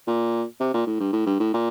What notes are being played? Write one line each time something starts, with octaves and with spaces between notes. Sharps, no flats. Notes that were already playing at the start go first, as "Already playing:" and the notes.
A#2
C3
A#2
A2
G2
A2
G2
A2
A#2